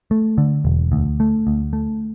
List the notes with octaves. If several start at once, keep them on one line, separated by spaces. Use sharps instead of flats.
A3
D3
E1
D2
A3
D2
A3